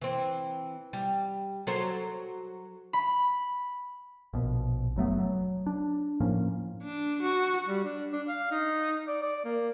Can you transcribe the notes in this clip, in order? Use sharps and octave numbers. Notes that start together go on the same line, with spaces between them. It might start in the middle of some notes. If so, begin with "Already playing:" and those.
E3 C4
G3
F#3 A4 C5
B5
A#1 B2
F#1 F#3 A3 B3
F#3
D4
A2 F3 A#3 C#4
D4
F#4
G3
D4
D4
F5
D#4
D5
D5
A#3